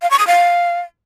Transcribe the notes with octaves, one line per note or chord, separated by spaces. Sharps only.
F5
C#6
D#6
F5